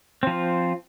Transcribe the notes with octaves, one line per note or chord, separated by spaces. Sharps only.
F3 C4 F4